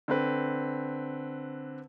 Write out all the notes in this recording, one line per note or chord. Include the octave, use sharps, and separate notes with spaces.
D3 C4 B4